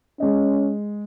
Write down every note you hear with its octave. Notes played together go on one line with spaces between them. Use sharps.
G#3 C#4 D#5